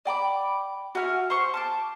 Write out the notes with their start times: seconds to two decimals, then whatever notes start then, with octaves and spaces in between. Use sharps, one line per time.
0.05 D5 G5 B5 D6
0.95 F#4 E5 G#5 F6
1.30 C5 C6 C#6 F6
1.54 A5 B5 D6